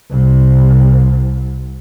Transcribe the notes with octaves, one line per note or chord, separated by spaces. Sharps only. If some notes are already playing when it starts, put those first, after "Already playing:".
C2 C3